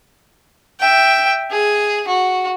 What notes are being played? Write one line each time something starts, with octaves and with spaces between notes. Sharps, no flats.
E5 G5
G#4
F#4